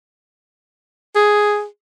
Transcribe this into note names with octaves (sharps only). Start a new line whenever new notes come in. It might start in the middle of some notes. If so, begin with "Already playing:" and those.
G#4